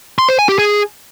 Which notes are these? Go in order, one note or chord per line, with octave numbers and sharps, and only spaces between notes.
C6
C5
G#5
G4
G#4